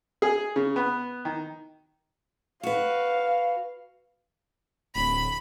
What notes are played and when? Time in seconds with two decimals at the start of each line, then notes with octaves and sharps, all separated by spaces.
0.22 G#4
0.56 C#3
0.76 B3
1.25 D#3
2.63 F#4 B4 F5
4.95 D1 B5